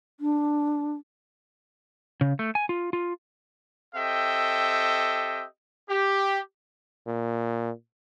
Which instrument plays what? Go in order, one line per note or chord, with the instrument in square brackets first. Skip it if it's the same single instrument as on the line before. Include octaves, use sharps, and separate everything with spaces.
[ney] D4
[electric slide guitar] C#3
A3
G#5
F4
F4
[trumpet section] C4 G4 A4 D#5 E5 G5
G4
[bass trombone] A#2